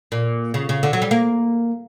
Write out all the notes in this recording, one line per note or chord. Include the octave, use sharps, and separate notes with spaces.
A#2
C#3
C#3
D3
F#3
G3
A#3